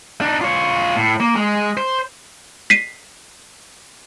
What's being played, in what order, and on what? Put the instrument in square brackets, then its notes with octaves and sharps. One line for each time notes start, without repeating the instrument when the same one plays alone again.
[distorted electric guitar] D4 D#4
F4 C#5
A2
A#3
G#3
C5
[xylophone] B6 C7 D#7